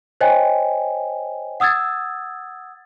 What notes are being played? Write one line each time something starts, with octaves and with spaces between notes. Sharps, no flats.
C5 C#5 D#5 G5 G#5
F#5 D#6 E6 G#6 A6